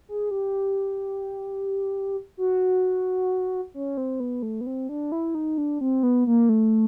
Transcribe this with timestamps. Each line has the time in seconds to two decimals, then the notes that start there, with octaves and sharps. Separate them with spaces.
0.09 G#4
0.31 G4
2.37 F#4
3.74 C#4
3.97 C4
4.20 B3
4.43 A3
4.61 B3
4.67 C4
4.89 D4
5.12 E4
5.35 D#4
5.58 D4
5.81 C4
6.03 B3
6.27 A#3
6.49 A3